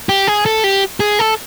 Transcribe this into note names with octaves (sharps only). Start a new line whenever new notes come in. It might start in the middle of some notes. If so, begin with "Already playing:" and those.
G4
G#4
A4
G4
G#4
A4